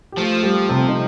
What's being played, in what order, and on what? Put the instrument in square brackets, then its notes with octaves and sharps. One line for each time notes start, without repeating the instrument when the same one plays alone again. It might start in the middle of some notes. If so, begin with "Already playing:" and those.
[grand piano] G4
[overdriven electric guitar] F3 [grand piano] A3 A4
[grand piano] G3 G4
C3 C4
D#4